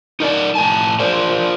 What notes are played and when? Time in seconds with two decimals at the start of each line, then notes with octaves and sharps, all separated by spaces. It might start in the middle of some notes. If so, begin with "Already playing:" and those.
0.20 D#4 A#4 D5
0.55 A2 G#5 A5
1.00 F4 A#4 C5 D5